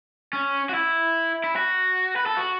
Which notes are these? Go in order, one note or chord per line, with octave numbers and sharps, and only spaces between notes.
C#4
F#4
E4
E4
F#4
B4
A4
F#4